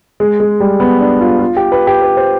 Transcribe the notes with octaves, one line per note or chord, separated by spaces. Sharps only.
G#3
G#3
G3
B3
D4
F4
F4
G4
B4
G4
B4
C5